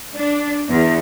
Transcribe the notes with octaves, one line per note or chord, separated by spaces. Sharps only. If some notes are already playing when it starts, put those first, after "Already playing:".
D4
E2